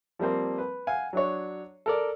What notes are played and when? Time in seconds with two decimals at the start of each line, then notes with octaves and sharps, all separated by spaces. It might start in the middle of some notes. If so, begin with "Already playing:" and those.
0.19 F3 G3 A#3 C4
0.58 B4
0.87 F5 F#5 G#5
1.13 F#3 D4 C#5
1.86 A4 A#4 D5